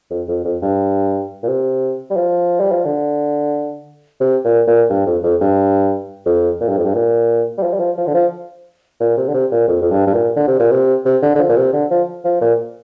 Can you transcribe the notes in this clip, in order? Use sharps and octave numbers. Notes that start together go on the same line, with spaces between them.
F2
F2
F2
G2
A#2
C3
G3
F3
G3
F3
D3
C3
A#2
A#2
G2
F2
F2
G2
F2
A#2
G2
F2
G2
A#2
G3
F3
G3
F3
F3
D3
F3
A#2
C3
D3
C3
A#2
F2
F2
G2
G2
A#2
D3
C3
A#2
C3
C3
D3
D3
F3
A#2
C3
D3
F3
F3
A#2